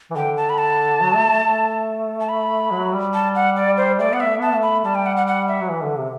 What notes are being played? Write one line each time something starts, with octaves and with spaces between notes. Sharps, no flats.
E3
D3 G5
A5
B5
A5
F#3
A3
A3
A3
A5
B5
F#3
G3
A5
F#5
D5
C5
A3 D5
B3 F#5
E5
A3
B3 A5
A3
B5
G3 A5
G5
F#5
F#5
F#5
E5
F#3
E3
D3
C3